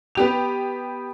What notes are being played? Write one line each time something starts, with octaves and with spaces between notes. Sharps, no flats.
B3 G4 F7